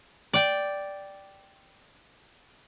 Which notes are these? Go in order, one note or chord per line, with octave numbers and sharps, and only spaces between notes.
D5 G5